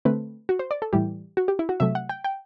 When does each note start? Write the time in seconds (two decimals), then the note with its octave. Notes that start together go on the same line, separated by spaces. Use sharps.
0.05 D3 A3 C4 B4
0.49 F#4
0.59 C5
0.71 D5
0.82 A4
0.93 A2 E3 G3 G4
1.37 F#4
1.48 G4
1.59 E4
1.69 F#4
1.80 C3 F#3 A3 E5
1.95 F#5
2.09 G5
2.24 G5